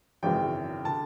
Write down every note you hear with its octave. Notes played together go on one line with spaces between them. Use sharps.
G#1 F#2 C#3 E3 G5
D3 A5